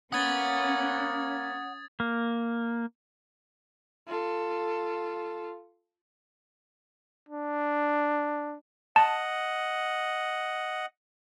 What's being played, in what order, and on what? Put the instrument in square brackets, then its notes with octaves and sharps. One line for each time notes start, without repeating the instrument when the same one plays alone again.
[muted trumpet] A#3 [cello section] C#4 [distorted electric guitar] F#5 B5 [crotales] D#6 G#6 A6
[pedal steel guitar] A#3
[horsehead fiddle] F4 A4
[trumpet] D4
[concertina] D#5 F#5 [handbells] A5